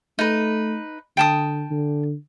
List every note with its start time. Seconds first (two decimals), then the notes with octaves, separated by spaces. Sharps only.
0.19 A3 D#4 B4
1.17 D3 G5 A5 D#6
1.71 D3